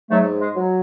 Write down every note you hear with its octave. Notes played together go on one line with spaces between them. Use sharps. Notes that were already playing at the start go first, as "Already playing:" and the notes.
G#2 F#3 A3
G#3
F#3